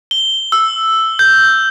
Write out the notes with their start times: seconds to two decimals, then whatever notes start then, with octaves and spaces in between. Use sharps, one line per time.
0.11 G7
0.52 E6
1.19 G6